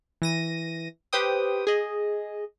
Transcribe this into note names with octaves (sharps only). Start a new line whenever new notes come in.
E3 A#6 D#7
G4 B4 C5 G5 D#6
G#4 D#5